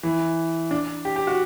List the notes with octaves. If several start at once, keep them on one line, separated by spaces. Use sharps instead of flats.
E3
D4
G4
G4
F#4